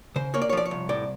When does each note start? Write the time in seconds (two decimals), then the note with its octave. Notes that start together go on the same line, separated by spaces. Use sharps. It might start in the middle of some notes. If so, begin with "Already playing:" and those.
0.16 C#3 C5
0.34 A#3 C#5
0.42 D5
0.49 C#5
0.53 F3 D5
0.65 C#5
0.71 C2
0.89 A2 D5